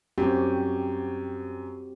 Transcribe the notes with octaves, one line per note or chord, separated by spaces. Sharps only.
F#2 C4 F#4 G4